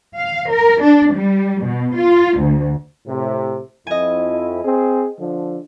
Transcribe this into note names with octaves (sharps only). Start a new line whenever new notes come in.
F5
A#4
D4
G3
B2
F4
D2
A2 C3
F2 E4 D#5 G#5
C4 G#4
D3 F3